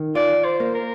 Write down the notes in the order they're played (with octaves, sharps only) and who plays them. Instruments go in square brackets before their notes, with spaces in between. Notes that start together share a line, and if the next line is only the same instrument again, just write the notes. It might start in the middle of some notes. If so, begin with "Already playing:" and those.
Already playing: [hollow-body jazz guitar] D#3
[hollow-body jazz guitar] F4 [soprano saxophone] D5
[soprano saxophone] C5
[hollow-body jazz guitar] A#3
[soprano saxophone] A#4